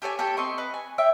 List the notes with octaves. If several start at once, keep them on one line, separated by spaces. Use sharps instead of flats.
G4 A4 C#5 G#5
G4 A4 C#5 G5
C4 D#5 C6 C#6
B4 D#5
G#5
C#5 E5 G5